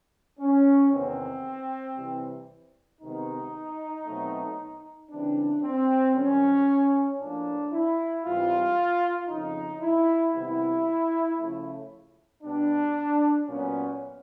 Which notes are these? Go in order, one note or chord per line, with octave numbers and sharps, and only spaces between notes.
C#4
E2 C3 D#3 G#3 B3 C4
C3 E3 G3
C3 D#3 G#3 B3 D#4
B2 F#3 A3 C4
C#3 E3 G3 C4 D4
C4
F#2 D#3 G3 C#4
A2 F3 A#3 D4
E4
G#2 E3 G3 C4 F4
F2 C#3 F3 D#4
E4
C3 D#3 G3 B3 E4
C#3 F3 A3
B2 G3 B3 D4
A#2 F#3 B3 C#4